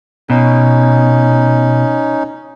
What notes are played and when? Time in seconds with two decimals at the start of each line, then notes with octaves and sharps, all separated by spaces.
0.30 B2 C#4 D#4